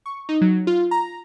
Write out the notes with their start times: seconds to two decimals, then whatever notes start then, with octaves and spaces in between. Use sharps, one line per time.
0.06 C#6
0.29 D#4
0.41 F#3
0.67 F4
0.91 A#5